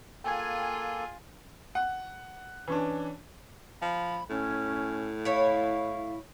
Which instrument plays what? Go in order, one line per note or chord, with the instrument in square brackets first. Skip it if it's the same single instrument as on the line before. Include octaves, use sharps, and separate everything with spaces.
[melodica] A#3 A4 [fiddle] F4 G#4 [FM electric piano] G5 G#5 G#6
[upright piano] F#5
E3 C#4 D4
[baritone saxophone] F3 [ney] B5
[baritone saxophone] A2 [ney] C#4
[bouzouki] E4 C#5 [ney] F5